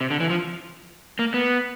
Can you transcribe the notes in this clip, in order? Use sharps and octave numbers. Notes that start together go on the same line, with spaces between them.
C3
D3
E3
F3
A#3
B3